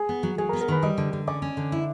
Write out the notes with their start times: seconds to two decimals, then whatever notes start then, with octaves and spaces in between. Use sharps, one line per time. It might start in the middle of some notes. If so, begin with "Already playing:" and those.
Already playing: G#4 G#5
0.09 B3
0.23 F#3
0.38 F#3 G#4 G#5
0.49 A#4 A#5
0.53 B3
0.61 A#4 A#5
0.68 D#3 B4 B5
0.83 G3 D#5 D#6
0.98 D3
1.13 D3
1.27 C#4 D5 D6
1.42 C#4
1.57 D3
1.72 E4